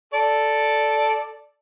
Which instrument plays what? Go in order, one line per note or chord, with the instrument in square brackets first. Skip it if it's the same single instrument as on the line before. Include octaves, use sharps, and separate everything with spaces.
[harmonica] A4 D5